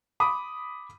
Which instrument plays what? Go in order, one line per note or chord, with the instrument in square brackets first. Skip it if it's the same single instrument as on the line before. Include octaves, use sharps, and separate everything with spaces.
[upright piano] B5 D6 D#6